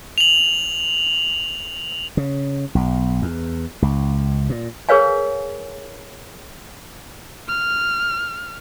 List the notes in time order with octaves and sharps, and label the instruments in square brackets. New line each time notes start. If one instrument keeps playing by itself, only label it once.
[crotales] F7 F#7
[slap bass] C#3
B1
E2
C#2
A#2
[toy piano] G#4 A#4 B4 C#5 F5 G#5
[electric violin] F6